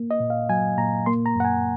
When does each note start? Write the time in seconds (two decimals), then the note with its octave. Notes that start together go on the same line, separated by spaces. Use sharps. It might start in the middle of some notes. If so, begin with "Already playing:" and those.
Already playing: A#3
0.11 D#5
0.20 A#2
0.30 F5
0.49 F#3 G#5
0.77 A#2 A#5
1.06 A#3 C6
1.26 A#5
1.36 F#2 F#5
1.45 G#5